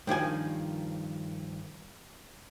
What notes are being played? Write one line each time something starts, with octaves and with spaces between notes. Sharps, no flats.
G2 D#3 F3 G#5